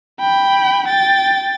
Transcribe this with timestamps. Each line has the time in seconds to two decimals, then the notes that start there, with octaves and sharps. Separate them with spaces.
0.20 G5 B5
0.87 G5 A6